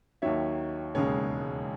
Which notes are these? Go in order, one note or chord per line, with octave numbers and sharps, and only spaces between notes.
D#2 D#3 F#3 C#5 E5
E1 D#2 C#3 G#3 C#5